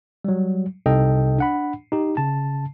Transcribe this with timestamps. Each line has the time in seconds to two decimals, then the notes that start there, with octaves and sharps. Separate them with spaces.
0.25 F#3 G3
0.86 C2 C3 D#4 A4 D#5 G5
1.39 D4 F#5 B5
1.92 D#4 G4
2.17 C#3 A5